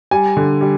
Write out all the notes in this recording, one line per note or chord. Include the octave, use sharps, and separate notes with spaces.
G3 G#5
D3
G3